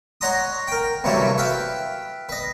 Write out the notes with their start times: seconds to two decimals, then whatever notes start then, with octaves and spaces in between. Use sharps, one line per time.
0.21 C#5 D#5 F#5 A#5 C6 D#6
0.68 A#4 G5
1.04 G2 C3 E3 F#3 A3 A#3
1.38 B4 E5 F5 G5
2.29 B4 D#5